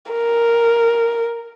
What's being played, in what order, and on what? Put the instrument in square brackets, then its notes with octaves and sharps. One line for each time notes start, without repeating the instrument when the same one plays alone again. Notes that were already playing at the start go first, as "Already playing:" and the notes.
[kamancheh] A#4